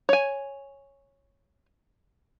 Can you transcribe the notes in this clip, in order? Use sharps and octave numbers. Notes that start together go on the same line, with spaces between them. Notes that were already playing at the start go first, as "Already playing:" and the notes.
C#5 G#5